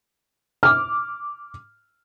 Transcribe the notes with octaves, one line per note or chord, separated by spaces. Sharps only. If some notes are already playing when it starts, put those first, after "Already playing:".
D6 F6